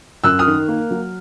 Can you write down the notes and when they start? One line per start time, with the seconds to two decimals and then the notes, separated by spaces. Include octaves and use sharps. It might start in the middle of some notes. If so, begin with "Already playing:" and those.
0.24 F#2 E6 F#6
0.39 D#6 F6
0.47 D#3
0.68 A#3
0.91 F#3